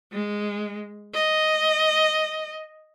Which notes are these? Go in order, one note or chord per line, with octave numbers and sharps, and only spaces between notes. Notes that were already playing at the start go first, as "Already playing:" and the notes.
G#3
D#5